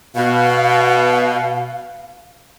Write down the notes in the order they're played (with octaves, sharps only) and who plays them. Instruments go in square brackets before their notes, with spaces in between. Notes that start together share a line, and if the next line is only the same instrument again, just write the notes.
[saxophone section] B2 [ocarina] F5